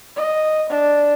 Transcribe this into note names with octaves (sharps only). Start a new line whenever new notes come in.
D#5
D4